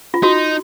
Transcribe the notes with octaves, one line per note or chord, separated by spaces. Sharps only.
F4
D#4 F#4